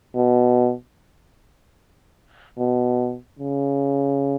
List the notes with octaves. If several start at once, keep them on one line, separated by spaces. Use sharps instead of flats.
B2
B2
C#3